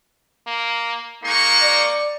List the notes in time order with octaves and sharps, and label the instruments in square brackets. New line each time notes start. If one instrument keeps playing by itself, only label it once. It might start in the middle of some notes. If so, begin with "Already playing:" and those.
[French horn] A#3
[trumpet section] G#3 D#4 C#6 [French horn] A#3
[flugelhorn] D5